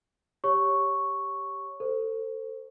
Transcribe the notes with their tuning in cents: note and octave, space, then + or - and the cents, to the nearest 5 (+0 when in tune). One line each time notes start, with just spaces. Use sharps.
G4 +0 C#5 +0 C#6 +0
A4 +25 C5 +0